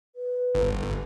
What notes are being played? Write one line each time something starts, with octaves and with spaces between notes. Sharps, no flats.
B4
G1